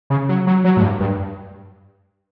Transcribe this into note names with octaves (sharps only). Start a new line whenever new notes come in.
C#3
F#3
F#3
F#3
A2
G2
G2